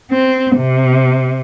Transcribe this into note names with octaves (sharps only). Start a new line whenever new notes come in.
C4
C3